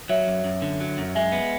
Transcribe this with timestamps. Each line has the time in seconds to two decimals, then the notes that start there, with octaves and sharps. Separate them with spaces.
0.09 F#3 C#5 E5
0.27 F#2
0.44 F#2
0.62 D3
0.80 F#3
0.98 F#2
1.15 G#3 E5 G#5
1.32 B3